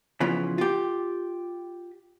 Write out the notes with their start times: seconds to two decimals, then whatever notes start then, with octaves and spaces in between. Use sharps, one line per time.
0.20 C#3 E3 F3 B3 F4
0.58 F4 G4